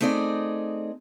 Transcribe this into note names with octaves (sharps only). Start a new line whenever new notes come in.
A3 C4 D#4 G#4 D5